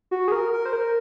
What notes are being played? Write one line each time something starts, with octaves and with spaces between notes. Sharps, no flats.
F#4
G#4
A#4
A#4
C5
A#4